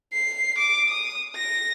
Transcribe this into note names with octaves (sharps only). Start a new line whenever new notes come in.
C7
D6
D#6
A#6